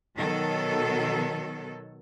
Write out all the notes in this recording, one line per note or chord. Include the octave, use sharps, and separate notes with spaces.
B2 D#3 F#3 A4